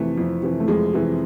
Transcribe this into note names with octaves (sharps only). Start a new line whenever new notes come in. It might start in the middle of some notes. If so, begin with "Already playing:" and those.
Already playing: F2 C3 E3 A3
F2
C3 E3
A3
F2 G#3
C3 E3